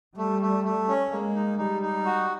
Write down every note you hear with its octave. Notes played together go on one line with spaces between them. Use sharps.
G3 A3
A3
A3
C#4
G#3 A#3
D#4
G3 D#4
D#4
F#4